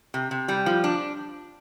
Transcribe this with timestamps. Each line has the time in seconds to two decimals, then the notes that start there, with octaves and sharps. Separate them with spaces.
0.14 C3
0.31 C3
0.48 G3
0.66 F3
0.84 D4